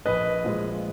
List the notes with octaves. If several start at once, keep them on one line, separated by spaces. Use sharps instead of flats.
A#1 B4 D#5
A#2 F3 G#3